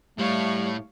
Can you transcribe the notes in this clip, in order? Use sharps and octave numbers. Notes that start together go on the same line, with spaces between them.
A2 G3 A3 C#5 F5